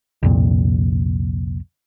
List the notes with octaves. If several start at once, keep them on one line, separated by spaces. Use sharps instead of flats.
C2 F2 A#2